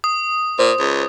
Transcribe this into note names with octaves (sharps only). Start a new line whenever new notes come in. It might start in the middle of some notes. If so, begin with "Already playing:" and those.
D#6
A#2 C5
C#2